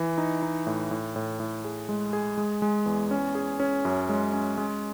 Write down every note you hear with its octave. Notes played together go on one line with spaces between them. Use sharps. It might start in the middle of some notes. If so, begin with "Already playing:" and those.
Already playing: E3
D#4
D#4
A2
A2
A2
A2
G#4
G#3
G#4
G#3
G#3
E2
C#4
G#4
C#4
F#2
G#3
C#4
G#3